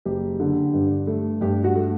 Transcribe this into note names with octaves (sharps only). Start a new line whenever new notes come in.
F#1 G4
D3
G2
A3
G2 G4
F#4
A3